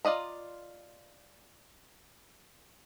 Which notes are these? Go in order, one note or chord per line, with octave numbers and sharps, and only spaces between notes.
F4 D5 D#5 A#5